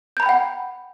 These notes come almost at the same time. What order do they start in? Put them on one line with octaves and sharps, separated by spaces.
G6 A#5 B5 G5 F#5